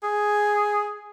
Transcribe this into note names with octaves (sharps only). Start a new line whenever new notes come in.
G#4